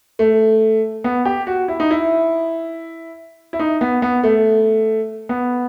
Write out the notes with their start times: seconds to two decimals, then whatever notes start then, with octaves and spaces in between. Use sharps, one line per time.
0.19 A3
1.04 B3
1.25 G4
1.47 F#4
1.68 E4
1.80 D#4
1.91 E4
3.53 E4
3.59 D#4
3.81 B3
4.02 B3
4.24 A3
5.29 B3